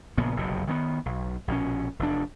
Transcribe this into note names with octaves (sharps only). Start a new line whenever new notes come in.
A#1 A#2 C#3 B3
F#1 B1 F2 C3
D#3 A#3 B3
B1
A#1 B2 D#3 C#4
F1 E2 D4